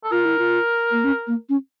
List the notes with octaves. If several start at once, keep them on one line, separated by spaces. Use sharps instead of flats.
A4
F4 A#4
E4
F4
A#3
C#4
A#3
C#4